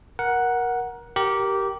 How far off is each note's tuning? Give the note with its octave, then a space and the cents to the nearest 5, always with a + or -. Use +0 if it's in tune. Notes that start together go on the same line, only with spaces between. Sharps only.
A#4 +20 F#5 +0
G4 -15 A#4 +0